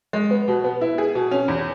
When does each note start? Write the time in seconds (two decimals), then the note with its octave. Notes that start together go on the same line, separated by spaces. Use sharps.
0.13 G#3
0.31 B3
0.48 B2
0.64 B3
0.81 E4
0.98 G#4
1.15 B2
1.31 C#4
1.48 E2